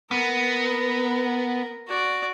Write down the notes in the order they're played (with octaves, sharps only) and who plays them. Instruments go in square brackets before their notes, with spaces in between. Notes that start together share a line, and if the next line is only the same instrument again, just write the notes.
[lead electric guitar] B3 [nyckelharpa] A#4
[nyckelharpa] F#4 D5